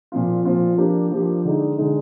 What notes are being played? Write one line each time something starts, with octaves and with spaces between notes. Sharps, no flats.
A#2 F3 C4 F4
A#2 F3 C4 F4
F3 A#3 D4 G4
F3 A#3 D4 G4
D3 G#3 D#4
D3 G#3 D#4